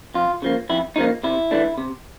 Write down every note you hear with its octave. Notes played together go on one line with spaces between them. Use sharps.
F2 F4
C#3 F3 A#3
F2 E4
C#3 F3 A#3 D#4
C3 E4
E3 A3 D4
C3